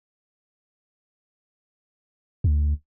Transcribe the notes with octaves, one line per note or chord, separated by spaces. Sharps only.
D2